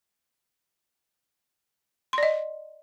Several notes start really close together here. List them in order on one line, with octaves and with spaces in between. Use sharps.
C6 D5 D#5